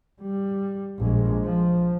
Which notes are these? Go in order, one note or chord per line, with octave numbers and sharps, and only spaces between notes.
G3
A#1 G#3
F3